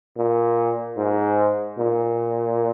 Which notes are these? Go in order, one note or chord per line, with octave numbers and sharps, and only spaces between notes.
A#2
G#2
A#2